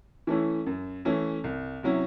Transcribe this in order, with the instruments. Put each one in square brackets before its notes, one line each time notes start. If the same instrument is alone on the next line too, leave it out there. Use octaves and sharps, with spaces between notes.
[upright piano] E3 A3 C#4 E4
F#2
E3 A3 C#4 E4
C2
C3 F#3 C#4 E4